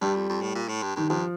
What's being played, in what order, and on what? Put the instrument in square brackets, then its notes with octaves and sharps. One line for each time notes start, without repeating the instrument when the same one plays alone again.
[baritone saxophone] G2 [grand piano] G3
[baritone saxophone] F2
F2
A2
A#2
A2
G2
[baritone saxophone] G2 [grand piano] D#3
[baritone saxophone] G2 [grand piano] F3